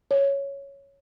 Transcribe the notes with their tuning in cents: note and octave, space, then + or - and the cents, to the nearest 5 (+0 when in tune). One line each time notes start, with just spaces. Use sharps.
C#5 +0